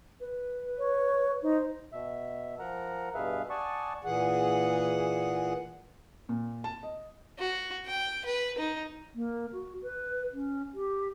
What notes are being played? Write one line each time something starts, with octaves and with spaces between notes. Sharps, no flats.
B4
C#5
D#4 C5
B2 E5
F3 A#4 F#5 A#5
G2 B2 G#4 B4 E5 F5
D5 F#5 G#5 A5 C#6 D#6
A#2 E3 G#4 F#5
A#2
A5
D#5
F#4
G5
B4
D#4
A#3
F#4
B4
C#4
G4